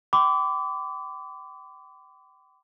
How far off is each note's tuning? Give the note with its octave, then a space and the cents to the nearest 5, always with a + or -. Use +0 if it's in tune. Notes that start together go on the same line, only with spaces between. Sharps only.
G5 -25 B5 +40 D6 -20